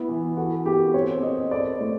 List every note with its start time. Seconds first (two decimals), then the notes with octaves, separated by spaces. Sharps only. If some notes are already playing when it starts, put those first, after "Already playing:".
Already playing: B3 E4
0.08 E3
0.37 F#4 A4
0.65 B3 G4
0.94 C4 C#5
1.23 C4 D#5
1.51 A4 D5
1.80 A3